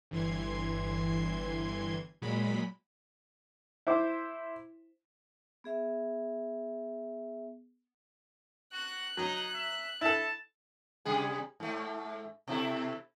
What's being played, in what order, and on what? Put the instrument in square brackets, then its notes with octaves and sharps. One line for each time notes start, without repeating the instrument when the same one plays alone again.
[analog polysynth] G1 E3 C6 G#6
A#2 F#3 G#3 B5
[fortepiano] E4 C5 D6
[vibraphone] B3 G#4 E5
[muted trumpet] F#4 [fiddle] F#6
[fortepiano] F#3 [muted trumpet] D#4
[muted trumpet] E5
[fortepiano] E4 A4 [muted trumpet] A5
[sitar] C3 G3 G#4
G#2 A3
B2 E4 A4